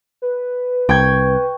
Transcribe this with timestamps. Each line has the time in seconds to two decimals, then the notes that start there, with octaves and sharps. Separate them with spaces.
0.22 B4
0.89 C2 G5 C#6 G#6